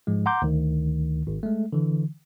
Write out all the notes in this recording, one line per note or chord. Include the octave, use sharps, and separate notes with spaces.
G#2 F3 G#3
F#5 A#5 C6 D6 G6
D2 D#3
G#1
G#3 A3
D3 E3